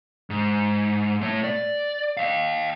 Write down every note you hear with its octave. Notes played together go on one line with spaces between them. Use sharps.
G#2
A3 C#5
D5
D#5 F5